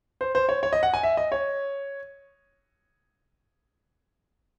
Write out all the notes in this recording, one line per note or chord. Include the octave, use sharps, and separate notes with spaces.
C5
C5
C#5
C#5
D#5
F#5
G#5
E5
D#5
C#5